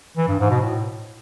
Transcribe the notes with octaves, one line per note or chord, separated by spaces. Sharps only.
E3
G2
G#2
B2
A2